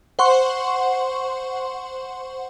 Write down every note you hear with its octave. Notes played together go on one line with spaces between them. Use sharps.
C5 F#5 C6 C#6